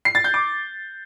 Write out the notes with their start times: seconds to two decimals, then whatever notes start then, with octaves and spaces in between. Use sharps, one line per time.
0.05 C7
0.15 A6
0.24 G6
0.34 D6